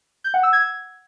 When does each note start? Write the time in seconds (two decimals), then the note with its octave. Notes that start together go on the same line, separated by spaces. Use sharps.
0.24 G6
0.34 F#5
0.43 E6
0.53 G#6